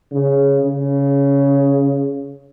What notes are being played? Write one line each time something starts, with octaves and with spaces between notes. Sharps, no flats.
C#3
C#3